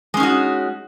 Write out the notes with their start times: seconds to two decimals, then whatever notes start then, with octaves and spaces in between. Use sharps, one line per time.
0.14 G#3
0.17 C#4
0.20 D#4
0.23 F#4